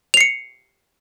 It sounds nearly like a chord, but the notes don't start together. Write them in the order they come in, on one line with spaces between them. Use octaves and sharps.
F7 C7 C#7